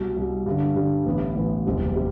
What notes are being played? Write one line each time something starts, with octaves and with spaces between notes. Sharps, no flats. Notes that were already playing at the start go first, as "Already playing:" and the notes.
Already playing: C2 B2 G3
C2 B2 G3
G2 D3 G3 D4
G2 D3 G3 D4
A1 A2 E3 B3
A1 A2 E3 B3
F#1 E2 C3 G3 C4
C3 G3